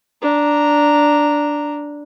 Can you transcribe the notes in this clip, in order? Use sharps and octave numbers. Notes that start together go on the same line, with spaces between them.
D4 A#5